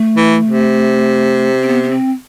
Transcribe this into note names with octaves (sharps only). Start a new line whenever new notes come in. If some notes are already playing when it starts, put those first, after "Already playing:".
Already playing: A3
E3
C3
C4
B3
B3
C4